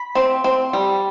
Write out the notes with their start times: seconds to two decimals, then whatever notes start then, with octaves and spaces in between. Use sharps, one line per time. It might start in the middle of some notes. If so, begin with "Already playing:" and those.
Already playing: B5
0.15 C4
0.44 C4
0.73 G3